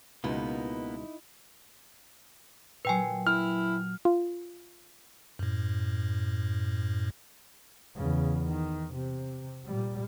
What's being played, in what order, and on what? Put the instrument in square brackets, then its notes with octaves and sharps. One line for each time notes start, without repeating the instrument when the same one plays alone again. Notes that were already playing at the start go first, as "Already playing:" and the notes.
[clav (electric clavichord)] C#2 B2 [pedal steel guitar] A#3 B3 [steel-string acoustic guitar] D#4 E4
[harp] A#2 F#3 [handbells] B4 G5 G#5
[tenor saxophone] E4 [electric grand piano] F6
[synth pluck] F4
[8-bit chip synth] F#2 A2
[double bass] E2 C#3
D#3
C3
A#2 G3